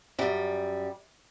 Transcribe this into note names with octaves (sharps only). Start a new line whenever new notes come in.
F#2 G3